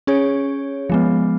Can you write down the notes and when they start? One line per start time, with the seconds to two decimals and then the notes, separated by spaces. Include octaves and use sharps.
0.07 C#4 G#4 C#5
0.90 F3 G#3 B3